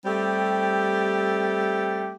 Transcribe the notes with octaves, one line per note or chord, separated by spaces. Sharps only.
G3 A3 C4 G4